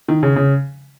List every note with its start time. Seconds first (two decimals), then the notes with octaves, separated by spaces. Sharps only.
0.09 D#3
0.23 C#3
0.36 C#3